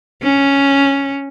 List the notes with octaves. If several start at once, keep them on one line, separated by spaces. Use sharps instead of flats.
C#4